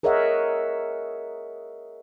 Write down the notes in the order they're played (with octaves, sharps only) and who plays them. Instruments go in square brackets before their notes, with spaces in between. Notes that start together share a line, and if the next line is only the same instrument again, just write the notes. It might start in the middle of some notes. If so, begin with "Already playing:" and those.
[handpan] G#4 A#4 C#5 D#5 E5 F#5